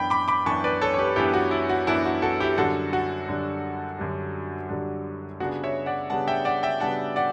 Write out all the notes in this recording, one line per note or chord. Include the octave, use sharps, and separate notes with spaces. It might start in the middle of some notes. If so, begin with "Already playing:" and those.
Already playing: F#2 E3 B3 D4 G5 B5
B5 D6
B5 D6
F#2 E3 B3 D4 A5 C#6
B4 D5
A4 C#5
C#5
G4 B4
F#2 E3 B3 D4 E4 G4
F#4
E4
F#4
F#2 E3 B3 D4 E4
F#4
F#4 A4
E4 G4
F#2 D3 G3 D4 F#4 A4
F#4
F#2 D3 G3 D4
F#2 D3 G3 D4
F#2 D3 G3 D4
C#3 G3 B3 D4 F#4
C#5 E5
D5 F#5
C#3 G3 B3 D4 F#5 A5
E5 G5
D5 F#5
E5 G5
C#3 G3 B3 D4 F#5 A5
D5 F#5